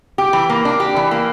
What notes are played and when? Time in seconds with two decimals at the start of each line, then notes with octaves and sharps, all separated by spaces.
0.18 G4
0.33 E3
0.49 A#3
0.65 D4
0.80 G4
0.96 E3
1.11 A#3